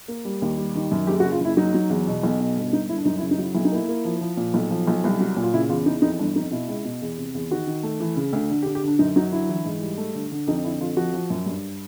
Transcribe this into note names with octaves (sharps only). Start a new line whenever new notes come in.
A#3
G3
D#2
G3
D#3
F#2
F#1 G4
F#4
C#3
F4
F#1 E4
F#3 D#4
F#3
E2
B2
B1
B2
G1
G1 D#4
G1 E4
D4
F#2 D#4
E4
C#3
D#4
F#3 E4
B1 E4
D#4
A#3 E4
A#3
F3
F3
A#2
B1
F3
B1
C2
F#3
A#2
F4
C#3 E4
E2 F4
E3 D#4
F2 D#4
G1 D4
F2 D#4
B2 E4
C#2
B2
E2
C3
E2
D#3 F#4
D#3
A3
E3
C#3
D2
D3
G4
D3
G4
D3 D4
F#2 D#4
F#3 D#4
D3 E4
E3
G#2
G3
A3
D3
D3
F2 D#4
D3 E4
F2 F4
F3 F#4
F3
F#2
G2